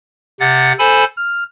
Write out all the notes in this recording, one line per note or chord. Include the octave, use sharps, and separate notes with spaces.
C3 F#5 A6
A4 C5 G#5 B5
F6